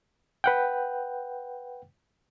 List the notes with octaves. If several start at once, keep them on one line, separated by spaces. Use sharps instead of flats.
B4 F#5 G5